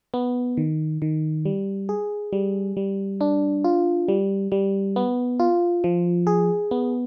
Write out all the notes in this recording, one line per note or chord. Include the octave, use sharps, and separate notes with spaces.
B3
D#3
D#3
G3
G#4
G3
G3
D4
F4
G3
G3
B3
F4
F3
G#4
B3